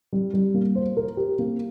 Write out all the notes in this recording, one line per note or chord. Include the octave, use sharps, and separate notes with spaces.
G3
G3
A#3
C5
A#4
G4
A#3